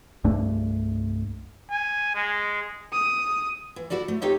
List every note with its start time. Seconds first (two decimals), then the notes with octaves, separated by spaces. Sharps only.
0.24 C2 G2 A3 D4
1.71 G#5
2.15 G#3
2.93 D#6
3.76 E3
3.90 E4 F#4 A4 D5
4.08 A3
4.22 C4 D#4 G4 A4 C#5